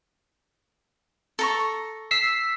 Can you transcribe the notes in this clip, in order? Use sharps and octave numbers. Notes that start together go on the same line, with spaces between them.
A4 A#5 C#6
E6 B6 C7